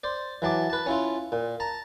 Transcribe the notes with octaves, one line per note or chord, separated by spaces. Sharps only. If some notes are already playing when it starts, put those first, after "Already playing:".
C5 D5
E3 F#3 A5 D6
B4 A5
C#4 E4 F4
A#2
A5 A#5